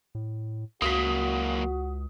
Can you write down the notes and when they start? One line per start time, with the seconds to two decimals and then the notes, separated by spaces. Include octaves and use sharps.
0.15 A2
0.82 C#2 F#3 A#3 F#4 D#6 B6